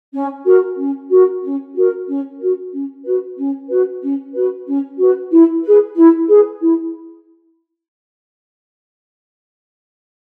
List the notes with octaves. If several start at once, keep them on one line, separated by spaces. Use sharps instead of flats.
C#4
F#4 A#4
C#4
F#4 A#4
C#4
F#4 A#4
C#4
F#4 A#4
C#4
F#4 B4
C#4
F#4 B4
C#4
F#4 B4
C#4
F#4 B4
E4
G#4 B4
E4
G#4 B4
E4